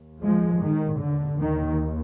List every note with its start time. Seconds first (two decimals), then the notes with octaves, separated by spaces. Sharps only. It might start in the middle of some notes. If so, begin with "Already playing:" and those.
Already playing: D#2
0.22 F3 G#3
0.61 D#3
0.99 D3
1.38 D#2 D#3